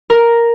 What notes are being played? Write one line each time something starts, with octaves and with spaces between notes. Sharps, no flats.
A#4